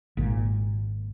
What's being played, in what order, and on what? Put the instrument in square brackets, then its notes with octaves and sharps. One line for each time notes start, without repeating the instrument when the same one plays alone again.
[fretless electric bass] G#1 A#2